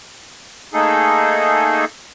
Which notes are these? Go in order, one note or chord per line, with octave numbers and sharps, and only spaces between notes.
A3 A#3 D#4 G#4 A4